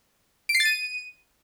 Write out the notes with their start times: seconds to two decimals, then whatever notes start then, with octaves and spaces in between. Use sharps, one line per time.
0.49 D7
0.55 C7
0.60 A6
0.65 D#7